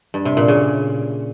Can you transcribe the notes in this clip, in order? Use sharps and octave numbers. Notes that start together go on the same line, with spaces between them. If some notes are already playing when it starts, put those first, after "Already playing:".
G2
C3
A#2
C#3